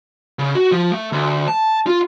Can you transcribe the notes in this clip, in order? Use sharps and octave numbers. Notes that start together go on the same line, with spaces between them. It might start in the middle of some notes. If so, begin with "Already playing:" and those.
C#3
F#4
F3
A3
D2
A5
F4